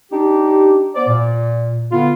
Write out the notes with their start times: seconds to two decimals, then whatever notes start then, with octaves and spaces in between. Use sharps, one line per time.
0.11 D4 D#4 G4
0.95 B3 C5 D5
1.08 A#2
1.92 D3 B3 F4